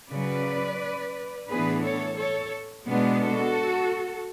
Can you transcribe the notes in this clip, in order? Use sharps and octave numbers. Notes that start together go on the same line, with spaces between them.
C#3 F#3 C#4 B4 D5
A2 E3 B3 D4 G#4 B4
A4 C#5
A4 C#5
B2 G#3 B3 D4
F#4 A4